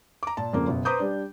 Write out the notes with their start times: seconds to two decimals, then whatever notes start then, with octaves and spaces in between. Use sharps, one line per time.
0.23 A#5 D6
0.37 A#2 A5
0.53 F2 C#3 A#3
0.67 F#1 B2
0.85 B4 C5 A#5 D6 D#6 G6
0.99 G3 D4